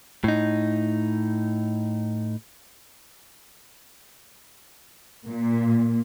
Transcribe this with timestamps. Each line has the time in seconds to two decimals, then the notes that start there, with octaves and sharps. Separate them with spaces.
0.24 A2 D#4
5.28 A#2